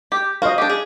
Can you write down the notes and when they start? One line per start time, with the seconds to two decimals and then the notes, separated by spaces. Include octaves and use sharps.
0.12 G4
0.42 F#4 C5 D#5 F5
0.58 D4 G4
0.69 G#4